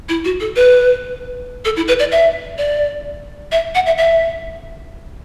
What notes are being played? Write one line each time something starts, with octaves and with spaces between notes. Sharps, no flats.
E4
F#4
A4
B4
A4
E4
B4
D5
E5
D5
E5
F#5
E5
E5